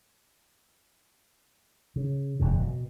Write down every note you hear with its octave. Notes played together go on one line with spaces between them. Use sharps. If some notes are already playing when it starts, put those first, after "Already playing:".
C#3
E1 F#2 C#3
B2